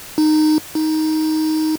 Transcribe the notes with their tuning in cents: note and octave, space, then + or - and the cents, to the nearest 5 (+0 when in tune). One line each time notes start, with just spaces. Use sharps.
D#4 -15
D#4 +10